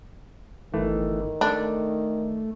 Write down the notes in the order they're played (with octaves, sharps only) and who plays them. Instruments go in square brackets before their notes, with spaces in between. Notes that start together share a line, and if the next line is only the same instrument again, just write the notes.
[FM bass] G1 [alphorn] D#3 [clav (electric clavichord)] E3 A3
[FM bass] A3 [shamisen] D4 [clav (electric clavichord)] D5